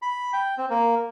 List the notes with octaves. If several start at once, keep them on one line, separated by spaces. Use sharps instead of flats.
B5
G5
C4
A#3